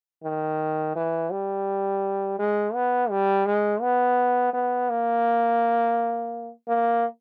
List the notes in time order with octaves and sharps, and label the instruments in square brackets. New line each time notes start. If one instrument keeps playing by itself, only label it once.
[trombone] D#3
E3
G3
G#3
B3
G3
G#3
B3
B3
A#3
A#3